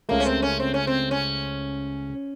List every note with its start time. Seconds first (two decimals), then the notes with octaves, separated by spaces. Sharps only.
0.09 C#2 C#3 A3 A#3
0.20 C#4
0.25 C4
0.42 C#4
0.60 C4
0.74 C#4
0.87 C4
1.11 C#4